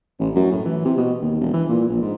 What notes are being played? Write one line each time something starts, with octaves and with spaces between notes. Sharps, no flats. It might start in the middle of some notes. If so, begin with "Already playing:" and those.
A1
F#2
A2
E3
C3
B2
D#2
E1
E3
A#2
A#1
G#2